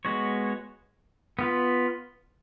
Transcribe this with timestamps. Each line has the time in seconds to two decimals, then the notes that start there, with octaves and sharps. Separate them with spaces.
0.05 G#3 B3 F#4 C#5
1.39 B3 F4 B4